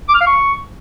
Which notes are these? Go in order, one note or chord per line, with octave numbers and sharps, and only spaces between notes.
D6
F6
F5
C#6